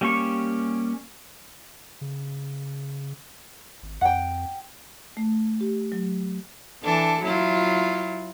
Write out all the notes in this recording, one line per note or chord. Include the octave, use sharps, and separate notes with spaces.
G3 A#3 C#4 G4 C#6
C#3
G#1
F2 F#5 G5
A3
G4
F#3
E3 D4 A4
F#3 E4 F4